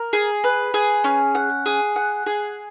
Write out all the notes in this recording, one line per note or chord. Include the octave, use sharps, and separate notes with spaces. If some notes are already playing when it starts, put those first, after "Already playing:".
Already playing: A#4
G#4
B4
G#4
C#4
F#5
G#4
F#5
G#4